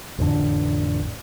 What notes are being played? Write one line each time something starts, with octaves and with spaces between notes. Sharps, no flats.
A1 F2 D3 D4